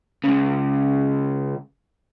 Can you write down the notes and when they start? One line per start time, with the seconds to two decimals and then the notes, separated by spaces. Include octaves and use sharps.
0.24 C#2 C#3